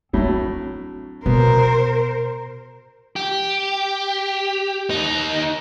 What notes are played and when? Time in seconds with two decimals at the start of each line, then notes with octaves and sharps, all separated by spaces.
0.13 A2 F#3 C4 D4
1.26 B2 B3 A#4 C5
3.16 G4
4.90 D#2 D#4